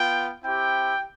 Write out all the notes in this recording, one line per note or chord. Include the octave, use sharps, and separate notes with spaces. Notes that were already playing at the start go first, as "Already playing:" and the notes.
Already playing: B3 F4 G5
C4 E4 G4 G5